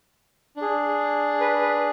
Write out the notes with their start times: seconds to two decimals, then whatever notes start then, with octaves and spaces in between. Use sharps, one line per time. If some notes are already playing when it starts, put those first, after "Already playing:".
0.56 D4
0.61 G#4
1.41 B4
1.62 B4